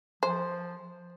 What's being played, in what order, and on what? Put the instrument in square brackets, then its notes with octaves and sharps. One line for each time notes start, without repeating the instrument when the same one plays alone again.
[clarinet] F3 [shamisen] C5